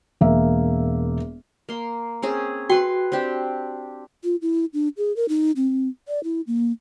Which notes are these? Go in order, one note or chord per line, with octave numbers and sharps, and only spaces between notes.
E1 A#3 E5
A#3 C6
C4 C#4 G#4
F#4 B4 G5 C6
C4 D4 G4
F4
E4
D4
G#4
A#4
D#4
C4
D5
E4
A#3